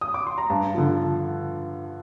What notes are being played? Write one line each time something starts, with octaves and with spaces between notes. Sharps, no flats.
D#6
D6
C6
A#5
G2 A5
D3 F3